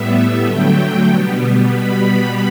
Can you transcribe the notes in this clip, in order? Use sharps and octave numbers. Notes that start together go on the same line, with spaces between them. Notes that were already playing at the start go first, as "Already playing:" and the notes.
Already playing: A2 G3 B3 E5
D3 F#3 A3 G5
B2 G3 B3
B2 G3 B3 B5